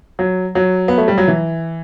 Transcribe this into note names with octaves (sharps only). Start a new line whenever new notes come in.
F#3
F#3
B3
A3
G3
F#3
E3